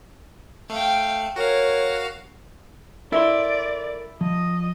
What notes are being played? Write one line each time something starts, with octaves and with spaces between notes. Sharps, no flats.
A3 F5 G5
F#4 A#4 C#5 F5
E4 A4 A#4 D5 C6
F3 D#5